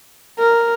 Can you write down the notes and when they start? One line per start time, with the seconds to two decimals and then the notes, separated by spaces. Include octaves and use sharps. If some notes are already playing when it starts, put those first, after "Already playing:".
0.39 A#4